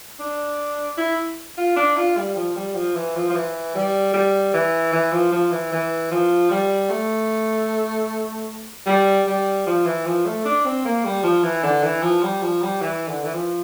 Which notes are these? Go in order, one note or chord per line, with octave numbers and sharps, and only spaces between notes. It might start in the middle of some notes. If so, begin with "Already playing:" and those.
D4
E4
F4
D4
F4
G3
F3
G3
F3
E3
F3
F3
E3
G3
G3
E3
E3
F3
F3
E3
E3
F3
G3
A3
G3
G3
F3
E3
F3
A3
D4
C4
A#3
G3
F3
E3
D3
E3
F3
G3
F3
G3
E3
D3
E3
F3